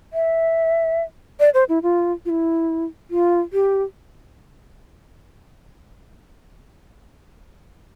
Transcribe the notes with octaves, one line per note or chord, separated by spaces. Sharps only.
E5
D5
C5
E4
F4
F4
E4
F4
G4